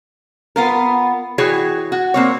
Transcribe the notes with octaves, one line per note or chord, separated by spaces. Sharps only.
B3 F4 A#4
E3 F#4 G#4 C#5 G5
F#4
A#3 C4 C#5